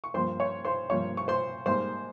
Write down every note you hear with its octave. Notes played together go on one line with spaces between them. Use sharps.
C#6
G2 F3 A#3 C5 C6
C#5 C#6
C5 C6
G2 F3 A#3 C#5 C#6
C#6
C5 C6
G#2 G3 A#3 C5 C6